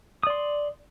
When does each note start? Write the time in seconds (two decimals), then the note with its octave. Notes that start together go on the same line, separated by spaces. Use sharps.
0.23 D#6
0.27 D5
0.30 C6